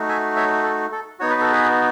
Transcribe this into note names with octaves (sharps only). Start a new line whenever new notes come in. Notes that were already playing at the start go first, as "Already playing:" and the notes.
Already playing: A3 D#4 F#4
E5 G#5
C#5 E5
A4
A4
B3 D#4 F#4 C#5
B4
A4
G#4 B4